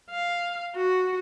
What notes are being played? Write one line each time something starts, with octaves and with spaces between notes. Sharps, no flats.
F5
F#4